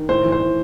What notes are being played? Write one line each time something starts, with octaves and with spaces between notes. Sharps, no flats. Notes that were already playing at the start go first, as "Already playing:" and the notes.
Already playing: D#3
A2 C5
E3
C5
A2